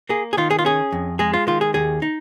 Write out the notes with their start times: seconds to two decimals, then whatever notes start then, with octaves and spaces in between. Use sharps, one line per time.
0.09 A#3 G#4
0.33 G#4
0.37 D#3 F4
0.51 G#4
0.59 F4
0.65 C#4 G#4
0.92 F2
1.19 G#3 G#4
1.33 F4
1.47 D#3 F4
1.61 G#4
1.74 D#2 G#4
2.02 D#4